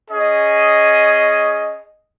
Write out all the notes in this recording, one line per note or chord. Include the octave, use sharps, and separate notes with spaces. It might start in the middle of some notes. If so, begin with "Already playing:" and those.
C#4 G#4 D#5